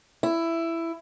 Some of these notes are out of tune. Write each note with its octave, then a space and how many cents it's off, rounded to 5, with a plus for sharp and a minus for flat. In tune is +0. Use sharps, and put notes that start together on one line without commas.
E4 +10